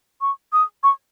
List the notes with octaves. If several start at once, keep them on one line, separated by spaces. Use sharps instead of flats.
C#6
D#6
C#6